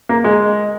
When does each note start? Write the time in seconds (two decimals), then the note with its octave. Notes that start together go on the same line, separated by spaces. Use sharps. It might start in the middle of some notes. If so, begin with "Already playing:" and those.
0.09 A#3
0.24 G#3